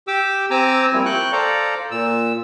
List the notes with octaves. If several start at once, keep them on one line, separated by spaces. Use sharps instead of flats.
G4 D6 E6
C4 G#5 A#5 D6 E6
F3 G3 A#3 C4 E4
G5 C#6 F#6
A4 C5 D5 F5 A#5
A#2 E6